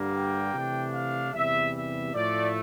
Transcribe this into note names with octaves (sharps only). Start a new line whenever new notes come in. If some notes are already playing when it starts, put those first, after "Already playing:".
Already playing: G2 D3 G3 A#3
G5
C3 E3 A3 D4
F5
E2 C3 E3 G3 E5
E5
A2 F3 A3 D5